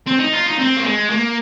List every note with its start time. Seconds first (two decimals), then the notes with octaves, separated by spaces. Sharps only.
0.07 C4
0.20 D#4
0.33 F4
0.46 D#4
0.59 C4
0.77 A#3
0.84 G#3
1.10 A#3